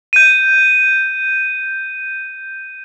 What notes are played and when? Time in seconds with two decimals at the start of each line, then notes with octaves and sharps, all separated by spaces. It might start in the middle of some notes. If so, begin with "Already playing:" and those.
0.13 G6 D#7